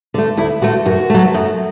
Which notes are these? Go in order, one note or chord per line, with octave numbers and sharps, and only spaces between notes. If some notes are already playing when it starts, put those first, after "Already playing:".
D3 A3
D2 E4
D3 A3 F#4
F#2 F#4
F#3 A3
F#2